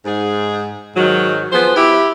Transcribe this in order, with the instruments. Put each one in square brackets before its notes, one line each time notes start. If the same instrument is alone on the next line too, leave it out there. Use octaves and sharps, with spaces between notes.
[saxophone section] G#2 G#4
G#2 D#3 F#3
F3 B3 G#4 C5
E4 G4